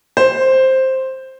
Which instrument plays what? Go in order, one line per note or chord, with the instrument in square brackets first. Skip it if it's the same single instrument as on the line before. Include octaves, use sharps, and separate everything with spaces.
[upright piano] C5